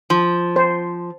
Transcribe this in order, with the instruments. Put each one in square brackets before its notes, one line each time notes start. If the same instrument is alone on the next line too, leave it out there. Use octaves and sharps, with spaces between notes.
[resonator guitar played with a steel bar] F3
[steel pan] C5